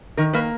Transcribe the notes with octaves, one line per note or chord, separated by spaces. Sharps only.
D#3 A#4
A#3 B4